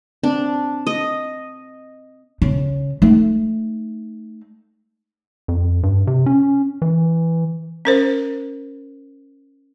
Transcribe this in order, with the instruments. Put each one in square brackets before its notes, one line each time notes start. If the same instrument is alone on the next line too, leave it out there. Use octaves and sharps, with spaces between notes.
[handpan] C4 [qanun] D4
[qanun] D#5
[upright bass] C#3
A3 D#4
[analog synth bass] F2
G2
C3
C#4
E3
[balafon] C#4 A#4 C5